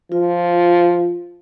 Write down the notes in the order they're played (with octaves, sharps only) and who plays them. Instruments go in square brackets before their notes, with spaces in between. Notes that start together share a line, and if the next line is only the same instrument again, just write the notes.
[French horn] F3 [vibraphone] F4